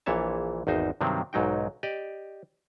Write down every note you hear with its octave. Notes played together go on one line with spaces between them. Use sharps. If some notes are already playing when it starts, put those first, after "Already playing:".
A#1 A#2 E3 C#5 E5 A5
G#1 E2 D#4 C5
G2 C3 D#3 F#3 C4
B1 G#2 F#3 D#4 G5
G4 D5 D#5